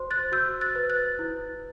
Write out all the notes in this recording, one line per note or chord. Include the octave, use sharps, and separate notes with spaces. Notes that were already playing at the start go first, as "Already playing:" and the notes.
Already playing: F#4 C5 C6
F#6 A6
F#4 E6 G6
F#6 A6
B4
F#6 A6
E4